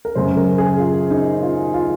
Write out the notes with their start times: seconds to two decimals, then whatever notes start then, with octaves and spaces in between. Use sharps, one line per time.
0.05 A#4
0.15 F#2 C#3 F#3 C5
0.37 A#4
0.58 G#4
0.79 F4
1.10 D#4
1.43 F4
1.74 F4